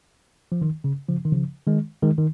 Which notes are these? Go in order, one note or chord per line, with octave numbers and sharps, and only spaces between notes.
F3
D#3
C#3
C#3 F3
D#3
C#3 F3
D#3 G#3
D#3 G#3
D#3